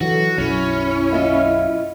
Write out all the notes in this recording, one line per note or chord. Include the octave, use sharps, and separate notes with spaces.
E3 F#3 F#4 A4
B1 F#2 C#4 E4
F4 D#5 E5